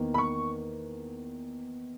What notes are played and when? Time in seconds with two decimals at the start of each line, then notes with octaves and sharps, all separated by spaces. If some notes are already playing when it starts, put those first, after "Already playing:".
Already playing: E2 D#3 A#3
0.14 B5
0.18 C#6